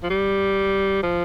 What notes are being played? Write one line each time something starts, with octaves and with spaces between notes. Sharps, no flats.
F3
G3
F3